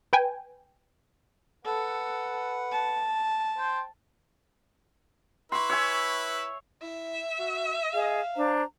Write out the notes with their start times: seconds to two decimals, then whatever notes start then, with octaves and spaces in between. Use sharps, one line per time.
0.13 B4 G5 G#5
1.65 A4 B4 F#5
2.72 A5
3.58 C5 G5
5.52 E4 B4 C6 C#6 E6
5.70 C#5 E5 G#5
6.82 E4 E5
7.39 F#4
7.94 G#4 D#5 F5
8.35 D4 C5 A#5